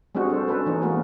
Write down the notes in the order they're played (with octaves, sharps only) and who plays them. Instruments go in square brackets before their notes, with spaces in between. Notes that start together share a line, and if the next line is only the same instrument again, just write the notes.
[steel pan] G3 G#3 C4 D4 F#4 G#4
A4 C5
C#4 D4 A4 B4
E3 A#3 C#4 D#4
G#3 A#3 B3 F#4